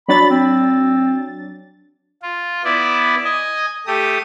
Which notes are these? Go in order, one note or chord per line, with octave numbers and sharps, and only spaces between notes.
F#3 D4 B5 A6
C4
F4
B3 E4 D5
D#5 G#5
A3 G4 D#6